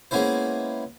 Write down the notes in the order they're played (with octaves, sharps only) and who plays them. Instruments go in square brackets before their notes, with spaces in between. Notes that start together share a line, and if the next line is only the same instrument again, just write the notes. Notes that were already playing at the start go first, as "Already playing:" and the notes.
[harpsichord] G#3 A#3 B3 C#4 E4 C5